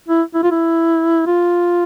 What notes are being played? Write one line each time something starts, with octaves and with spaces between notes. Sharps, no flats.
E4
E4
F4
E4
F4